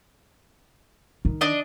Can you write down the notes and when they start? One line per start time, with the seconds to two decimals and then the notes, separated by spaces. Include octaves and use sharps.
1.25 D#3
1.41 D4 D#5